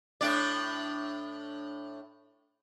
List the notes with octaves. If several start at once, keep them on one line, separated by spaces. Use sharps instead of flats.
A2 D4 D5